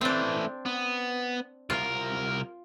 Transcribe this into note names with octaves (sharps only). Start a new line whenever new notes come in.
E3 A3 C4 D4
B3
C2 F4 A#4